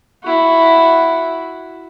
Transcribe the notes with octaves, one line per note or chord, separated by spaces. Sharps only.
E4 F#4